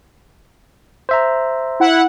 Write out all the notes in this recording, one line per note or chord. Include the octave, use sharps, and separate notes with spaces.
C5 E5 A#5
E4 F#5